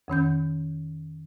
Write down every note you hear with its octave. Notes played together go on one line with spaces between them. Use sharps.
F2 D#3 C#4 G6